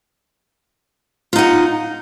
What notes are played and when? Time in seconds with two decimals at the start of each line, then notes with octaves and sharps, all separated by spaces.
1.33 F4
1.36 D#4
1.38 F#5